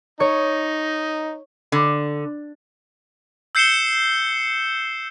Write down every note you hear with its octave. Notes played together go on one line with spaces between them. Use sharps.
D#4 C#5
D3
E6 G6 C7 C#7 E7 G7